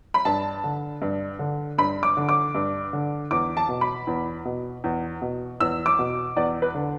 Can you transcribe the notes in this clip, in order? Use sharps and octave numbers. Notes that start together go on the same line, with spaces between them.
B5
G2 A5
D3
G2
D3
G2 B5
D6
D3
D6
G2
D3
E2 D6
A5
B2
B5
E2
B2
E2
B2
E2 E6
D6
B2
E2 D5
B4
D3